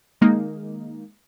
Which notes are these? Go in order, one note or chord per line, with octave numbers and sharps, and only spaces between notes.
D#3 G#3 A#3 D#4